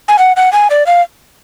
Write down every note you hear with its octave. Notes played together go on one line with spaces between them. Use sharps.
G#5
F#5
F#5
G#5
D5
F5